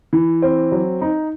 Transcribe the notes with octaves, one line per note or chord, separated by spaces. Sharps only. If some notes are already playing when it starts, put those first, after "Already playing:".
E3
C4
F#3
D#4